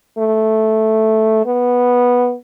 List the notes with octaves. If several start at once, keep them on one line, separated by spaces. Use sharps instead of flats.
A3
B3